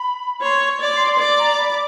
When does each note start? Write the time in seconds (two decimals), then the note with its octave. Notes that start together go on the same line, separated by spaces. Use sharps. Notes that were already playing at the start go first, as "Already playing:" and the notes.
Already playing: B5
0.41 C#5 C6
0.80 D5
0.93 C6
1.19 D5
1.38 A#5
1.58 B5